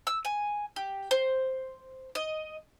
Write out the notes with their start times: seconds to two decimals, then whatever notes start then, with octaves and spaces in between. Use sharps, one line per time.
0.07 E6
0.25 G#5
0.76 G4
1.11 C5
2.15 D#5